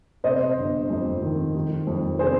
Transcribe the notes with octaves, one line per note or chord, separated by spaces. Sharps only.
C3 C5 D#5
G1
F2
D#3
D#3
F2
C3 G#4 C5